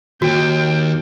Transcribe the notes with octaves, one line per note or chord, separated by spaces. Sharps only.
D#2 F#4 G5